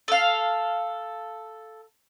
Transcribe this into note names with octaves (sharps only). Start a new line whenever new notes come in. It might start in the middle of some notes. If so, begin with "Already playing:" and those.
A4 F5